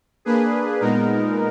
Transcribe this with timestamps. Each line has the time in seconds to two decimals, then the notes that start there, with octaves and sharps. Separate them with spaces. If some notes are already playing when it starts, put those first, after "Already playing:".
0.25 A#3 D4 G#4 B4
0.80 A#2 G#3 B3 D#4 A#4